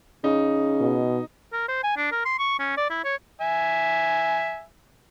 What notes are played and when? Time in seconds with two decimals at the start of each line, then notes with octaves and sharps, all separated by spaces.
0.24 C#3 D#4
0.81 B2
1.53 A#4
1.68 C5
1.84 G#5
1.97 D4
2.12 A#4
2.25 C6
2.39 C#6
2.59 C#4
2.77 D5
2.90 E4
3.04 C#5
3.41 E5 G#5